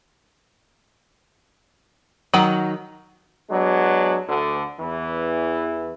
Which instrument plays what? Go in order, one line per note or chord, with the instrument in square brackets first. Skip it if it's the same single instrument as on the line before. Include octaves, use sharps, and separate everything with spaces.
[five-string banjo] D#3 F#3 [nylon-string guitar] F#5
[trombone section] F#3 G#3 B3 D4
D2 D3
E2 E3